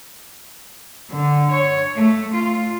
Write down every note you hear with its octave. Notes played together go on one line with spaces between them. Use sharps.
D3
C#5
A3
F4